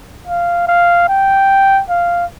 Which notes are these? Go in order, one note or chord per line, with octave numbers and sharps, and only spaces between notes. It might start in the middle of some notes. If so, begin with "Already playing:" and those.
F5
F5
G5
F5